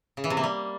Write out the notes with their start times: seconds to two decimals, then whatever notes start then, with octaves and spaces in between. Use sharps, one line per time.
0.17 C#3
0.24 E3
0.30 C3
0.37 A#3
0.44 G3